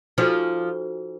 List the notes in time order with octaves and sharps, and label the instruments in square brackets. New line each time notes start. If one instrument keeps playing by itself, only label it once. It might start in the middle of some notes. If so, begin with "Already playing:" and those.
[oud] F3 [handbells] D#4 F#4 A4 C5